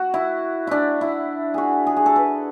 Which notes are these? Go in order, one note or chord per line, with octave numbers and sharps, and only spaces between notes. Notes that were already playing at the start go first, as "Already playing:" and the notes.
Already playing: F#4
E4
D4 E4
E4
F#4 G#4
G#4
G#4
A4
B4